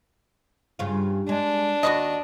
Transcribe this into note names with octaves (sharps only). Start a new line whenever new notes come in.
G2 C#3 F4
G#3 D4
D#2 F#4 B4 D#5